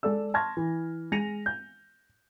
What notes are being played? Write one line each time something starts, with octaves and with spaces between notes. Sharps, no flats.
G#3 G#4 A4 D5 E6
A5 C6 C#6 F6 G#6 A#6
E3
G#3 G#5 A#6 C#7 D#7 F7
G6